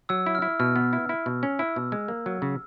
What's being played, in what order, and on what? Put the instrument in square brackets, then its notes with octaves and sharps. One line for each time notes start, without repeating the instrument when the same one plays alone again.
[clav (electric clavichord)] F#3 [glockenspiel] E6
[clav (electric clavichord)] E4
[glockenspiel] F6
[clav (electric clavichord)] E4
[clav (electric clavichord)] B2 [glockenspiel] F6
[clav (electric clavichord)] B3
E4
E4
B2
C#4
[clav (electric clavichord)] E4 [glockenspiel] E6
[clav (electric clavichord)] B2
G#3
A#3
F#3
C#3